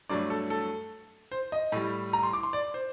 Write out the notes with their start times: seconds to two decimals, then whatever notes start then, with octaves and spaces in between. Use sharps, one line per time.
0.09 G2 F#3 A3 D5
0.30 A4
0.50 A4
1.32 C5
1.52 D#5
1.72 A2 G3
2.13 A#5
2.23 C6
2.33 D6
2.43 C6
2.53 D5
2.74 C5